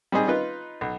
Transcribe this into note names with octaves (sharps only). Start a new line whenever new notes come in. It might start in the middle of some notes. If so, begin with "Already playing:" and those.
G3 C4 D#4 G#4
D#4 F4 B4
B1